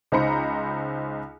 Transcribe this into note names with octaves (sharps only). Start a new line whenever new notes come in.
C#2 D#4 C5 A#5 B5 C#7